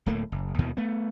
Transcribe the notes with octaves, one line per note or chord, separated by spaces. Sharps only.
D1 A2 A3 A#3
F#1
D#2 B2 D#3 E3
A3 B3